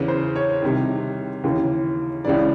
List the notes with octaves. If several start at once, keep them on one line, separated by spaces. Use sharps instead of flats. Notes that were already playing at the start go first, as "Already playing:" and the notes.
Already playing: E2 C#3 E3 B4
C5
C#5
C2 C3 D#3
D#2 C#3 E3
C#2 C#3 E3 D5